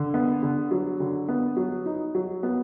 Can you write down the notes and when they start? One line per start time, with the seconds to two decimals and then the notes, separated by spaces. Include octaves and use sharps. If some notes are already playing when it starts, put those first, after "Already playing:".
Already playing: D3
0.14 B3
0.43 D3
0.71 F#3
1.00 D3
1.28 B3
1.57 F#3
1.86 D#4
2.15 F#3
2.43 B3